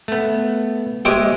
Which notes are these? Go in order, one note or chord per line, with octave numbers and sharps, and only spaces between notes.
A3 B3
G#3 G4 C5 D#5 E5 D6